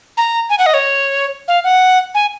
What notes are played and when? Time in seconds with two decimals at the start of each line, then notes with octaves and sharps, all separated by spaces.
0.17 A#5
0.50 G#5
0.59 F#5
0.66 D#5
0.74 C#5
1.48 F5
1.64 F#5
2.15 G#5